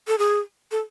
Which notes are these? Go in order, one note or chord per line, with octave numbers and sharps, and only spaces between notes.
A4
G#4
A4